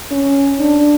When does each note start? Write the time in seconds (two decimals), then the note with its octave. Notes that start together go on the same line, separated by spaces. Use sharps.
0.11 C#4
0.60 D4